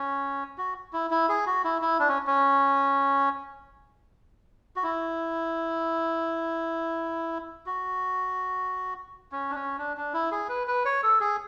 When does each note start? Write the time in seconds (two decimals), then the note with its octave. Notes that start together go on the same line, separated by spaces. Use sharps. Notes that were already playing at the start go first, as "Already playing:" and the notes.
Already playing: C#4
0.58 F#4
0.93 E4
1.10 E4
1.29 G#4
1.46 F#4
1.64 E4
1.82 E4
1.99 D4
2.09 C#4
2.27 C#4
4.76 F#4
4.83 E4
7.66 F#4
9.32 C#4
9.50 D4
9.55 C#4
9.78 D4
9.97 D4
10.14 E4
10.32 G#4
10.49 B4
10.67 B4
10.85 C#5
11.03 A4
11.20 G#4